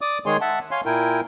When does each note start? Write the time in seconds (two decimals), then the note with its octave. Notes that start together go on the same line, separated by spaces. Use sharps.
0.01 D5 D6 D#6
0.26 D#3 G#3 G#4 C#5 G#5 C6
0.41 E5 F#5 A5
0.71 C#5 F5 G#5 C6
0.86 A#2 E4 A#4 G5 G#5